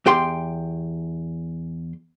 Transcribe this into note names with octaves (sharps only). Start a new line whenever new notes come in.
E2 G4 G5 C6